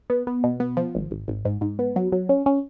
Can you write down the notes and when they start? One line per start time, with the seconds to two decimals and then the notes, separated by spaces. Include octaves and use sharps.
0.10 B3
0.27 B3
0.44 B2
0.60 B3
0.77 F3
0.95 G#1
1.11 G#1
1.28 G#1
1.45 G#2
1.61 G#2
1.79 B3
1.96 F#3
2.12 F#3
2.29 C#4
2.46 C#4